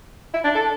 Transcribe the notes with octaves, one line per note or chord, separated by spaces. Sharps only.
E4
D4
A4